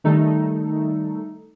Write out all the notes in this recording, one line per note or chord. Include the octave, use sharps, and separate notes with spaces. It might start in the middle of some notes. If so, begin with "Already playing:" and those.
D#3 G3 A3 D#4 A4